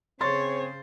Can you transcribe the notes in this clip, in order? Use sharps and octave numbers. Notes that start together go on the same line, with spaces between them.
C#3 C4 G#4 C5 C#5 C6 A6